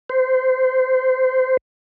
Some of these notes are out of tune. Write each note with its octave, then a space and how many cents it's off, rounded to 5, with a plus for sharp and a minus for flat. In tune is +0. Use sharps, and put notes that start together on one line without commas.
C5 -20